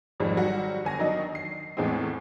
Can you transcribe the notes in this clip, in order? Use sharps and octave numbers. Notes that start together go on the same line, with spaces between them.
G#1 F2 G3 G#3
F#3 G3 F#4
G1 G#5 A#6
D#3 F#3 D4 D#4 D#5
C7
E2 A2 E3 G#3 B3 C4